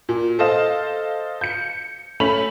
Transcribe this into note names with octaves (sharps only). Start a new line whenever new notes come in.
A#2
A4 C5 D#5 F5 E7
G6 C#7
A3 C#4 B5 F7 F#7